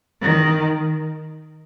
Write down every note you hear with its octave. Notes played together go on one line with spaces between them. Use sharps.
D#3